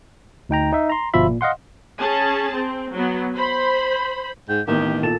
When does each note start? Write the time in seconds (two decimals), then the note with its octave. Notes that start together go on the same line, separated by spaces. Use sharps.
0.49 D2 D#4 G5 A#5
0.73 D#4 E5
0.90 A#5 C6
1.14 G1 B2 F3 F4 E5 B5
1.29 A#2
1.41 D#5 F5 F#5 C6
1.99 C#4 G#4 A5
2.55 C4
2.93 F#3 B3
3.34 C5 B5
4.49 G#2 G5
4.68 A1 D#3 A#3 B3 G4
5.03 A#2 A4 A5 E7